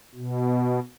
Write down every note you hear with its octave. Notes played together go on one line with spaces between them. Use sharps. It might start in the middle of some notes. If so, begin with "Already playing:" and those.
B2